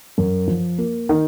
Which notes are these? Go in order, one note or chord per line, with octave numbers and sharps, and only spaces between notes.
F#2
F3
A#3
D#3